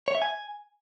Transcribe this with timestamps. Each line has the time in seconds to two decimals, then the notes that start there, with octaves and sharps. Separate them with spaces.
0.08 C#5
0.15 E5
0.22 G#5